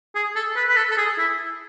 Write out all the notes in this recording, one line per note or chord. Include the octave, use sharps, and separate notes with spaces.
G#4
A4
B4
B4
A4
A4
G#4
E4